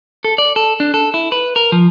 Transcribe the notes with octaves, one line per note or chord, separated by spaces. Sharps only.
A4
D5
A4
D4
A4
E4
B4
A#4
F3